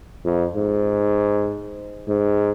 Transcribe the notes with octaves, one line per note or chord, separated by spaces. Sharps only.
F2
G#2
G#2